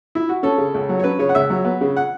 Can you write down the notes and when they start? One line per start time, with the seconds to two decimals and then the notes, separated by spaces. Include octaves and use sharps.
0.15 E4
0.29 F#4
0.43 C#4 A4
0.58 C#3
0.74 C#2
0.89 F#3
1.00 C#5
1.04 C#4 B4
1.19 C#3 C#5
1.29 F#5
1.35 C#2 E5
1.50 F#3
1.65 B3
1.81 C#3
1.96 F#5